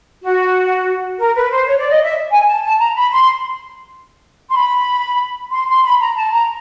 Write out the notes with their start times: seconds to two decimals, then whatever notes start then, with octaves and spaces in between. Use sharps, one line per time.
0.23 F#4
1.19 A#4
1.35 B4
1.51 C5
1.66 C#5
1.78 D5
1.90 D#5
2.03 E5
2.31 G#5
2.47 A5
2.63 A5
2.79 A#5
2.95 B5
3.11 C6
4.51 C6
4.55 B5
5.51 C6
5.68 C6
5.83 B5
6.00 A#5
6.16 A5
6.31 A#5